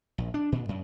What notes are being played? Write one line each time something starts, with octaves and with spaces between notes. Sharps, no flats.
A#1
D4
A#2
F#2